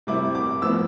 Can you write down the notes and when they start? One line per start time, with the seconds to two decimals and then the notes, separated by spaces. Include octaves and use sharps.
0.07 C3 G3 C4 E4 D6
0.35 D6
0.62 A2 F3 B3 E6